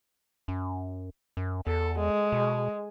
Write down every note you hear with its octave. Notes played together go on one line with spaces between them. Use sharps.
F#2
F#2
E2 A4
G#3
B2